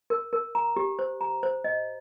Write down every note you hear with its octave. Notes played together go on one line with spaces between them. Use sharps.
A#4
A#4
A#5
G4
C5
A#5
C5
D#5